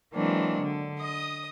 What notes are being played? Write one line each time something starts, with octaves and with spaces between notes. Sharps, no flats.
E3 F#3 G#3 A#3 C4 D4
D3
D#5 D#6